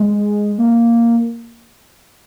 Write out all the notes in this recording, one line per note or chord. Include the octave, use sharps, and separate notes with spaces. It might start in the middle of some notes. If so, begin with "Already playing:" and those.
Already playing: G#3
A#3